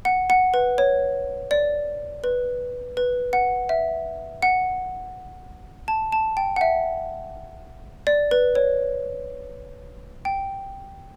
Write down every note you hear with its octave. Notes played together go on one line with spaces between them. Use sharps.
F#5
F#5
B4
C#5
D5
B4
B4
F#5
E5
F#5
A5
A5
G5
F#5
E5
D5
B4
C#5
G5